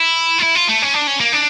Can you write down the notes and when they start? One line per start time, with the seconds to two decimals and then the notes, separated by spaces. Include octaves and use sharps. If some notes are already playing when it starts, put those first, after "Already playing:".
Already playing: E4
0.38 F4
0.42 E4
0.55 F4
0.68 A3
0.82 C#4
0.94 D4
1.07 C#4
1.20 A#3
1.33 D4